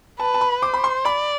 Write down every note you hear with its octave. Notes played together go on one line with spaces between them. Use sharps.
B4 A5
A5
B5
C5 D6
B5
C6
D5 B5